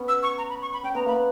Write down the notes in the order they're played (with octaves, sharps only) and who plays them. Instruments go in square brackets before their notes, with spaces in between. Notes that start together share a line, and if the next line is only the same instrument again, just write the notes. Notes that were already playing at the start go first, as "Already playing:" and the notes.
Already playing: [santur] B3 C#4
[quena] E6
C#6
A#5
B5
C#6
B5
[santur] C#4 [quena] G5
[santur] B3 [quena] A#5
[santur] A#3 [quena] B5
[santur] B3